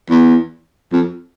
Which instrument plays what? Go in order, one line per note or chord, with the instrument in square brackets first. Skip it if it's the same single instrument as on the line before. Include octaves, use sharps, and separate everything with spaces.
[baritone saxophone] E2
F2